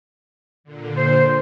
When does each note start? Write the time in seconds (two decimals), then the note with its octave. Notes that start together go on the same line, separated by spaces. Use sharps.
0.64 A#2 D3
0.98 C5